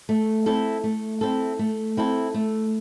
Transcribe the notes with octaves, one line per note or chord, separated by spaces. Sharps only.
A3
C4 E4 A4
A3
C4 E4 A4
A3
C4 E4 A4
A3